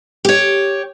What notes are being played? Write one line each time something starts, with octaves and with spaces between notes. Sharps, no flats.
G4 C#5